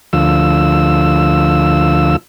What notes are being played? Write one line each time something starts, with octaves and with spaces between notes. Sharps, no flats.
D2 F3 E6